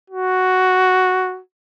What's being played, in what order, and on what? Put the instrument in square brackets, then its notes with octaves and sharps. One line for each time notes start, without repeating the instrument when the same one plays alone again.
[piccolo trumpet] F#4